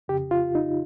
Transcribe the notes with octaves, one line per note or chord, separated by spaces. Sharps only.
F2 C#3 G4
F4
D#4